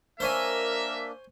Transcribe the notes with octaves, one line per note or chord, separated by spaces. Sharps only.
A#3 D4 A#4 C5 C#5 E5 G#5